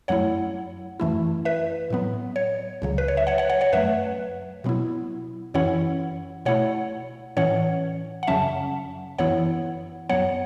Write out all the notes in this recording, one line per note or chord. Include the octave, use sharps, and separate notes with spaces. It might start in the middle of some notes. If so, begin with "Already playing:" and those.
F#2 F#3 A3 E4 C#5 F#5
F#2 E3 A3 E4
B4 E5
A2 F#3 B3
C#5
C#2 C#3 F#3
B4
C#5
E5
C#5 F#5
C#5 F#5
C#5 F#5
C#5 F#5
F#2 F#3 A3 B4 E5
B2 F#3 B3 E4
F#2 E3 C#4 E4 C#5 F#5
B2 A3 E4 C#5 F#5
A2 E3 C#4 C#5 F#5
F#5
F#2 C#3 F#3 C#4 E5 A5
F#2 E3 B3 E4 C#5 F#5
F#2 F#3 B3 C#5 F#5